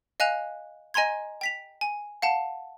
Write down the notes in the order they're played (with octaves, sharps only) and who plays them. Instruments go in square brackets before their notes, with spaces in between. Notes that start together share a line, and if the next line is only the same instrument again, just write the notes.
[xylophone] D#5 F5 G#5 F#6 F7
D#5 G#5 A#5 C6 G#6
G5 B6 F7
G#5
F5 F#5 A5